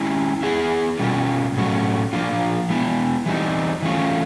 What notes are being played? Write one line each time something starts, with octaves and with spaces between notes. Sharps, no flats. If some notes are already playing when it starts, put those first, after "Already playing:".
Already playing: G#3 C#4 E4
B3 E4 G#4
B2 G3 A#3 C#4 F4
A2 F#3 A3 C#4 F#4
F3 A#3 D4 F4
G#3 B3 E4
E3 G3 C4 D#4
E3 A3 C#4 F4